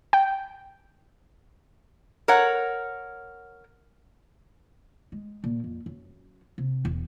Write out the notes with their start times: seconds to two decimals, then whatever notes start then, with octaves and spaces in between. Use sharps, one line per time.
0.13 G5
2.28 A#4 C#5 F#5
5.12 G#3
5.44 A#2
5.64 F2
5.86 F#2
6.58 C3
6.85 E1